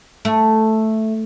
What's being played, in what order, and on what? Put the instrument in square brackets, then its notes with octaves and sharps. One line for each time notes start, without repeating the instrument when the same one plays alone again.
[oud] A3